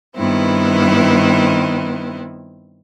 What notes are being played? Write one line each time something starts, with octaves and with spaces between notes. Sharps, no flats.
G2 D#3 B3 C4 E4